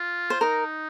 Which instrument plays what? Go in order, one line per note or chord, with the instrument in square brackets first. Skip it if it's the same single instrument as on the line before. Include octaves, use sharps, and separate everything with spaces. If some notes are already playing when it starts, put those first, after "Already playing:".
Already playing: [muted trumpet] F4
[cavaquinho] C5
[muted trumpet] D#4 [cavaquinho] A#4